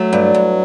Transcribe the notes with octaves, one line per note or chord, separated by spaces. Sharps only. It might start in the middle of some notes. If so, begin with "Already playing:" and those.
Already playing: F#3 A3
G2
G2